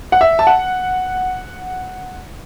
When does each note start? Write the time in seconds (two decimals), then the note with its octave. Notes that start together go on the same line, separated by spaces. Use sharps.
0.12 F#5
0.21 E5
0.39 A5
0.47 F#5